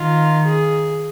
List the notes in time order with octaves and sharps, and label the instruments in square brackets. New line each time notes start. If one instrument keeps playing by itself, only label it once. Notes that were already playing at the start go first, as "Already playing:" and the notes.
Already playing: [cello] D#3 [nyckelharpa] F4
[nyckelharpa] G#4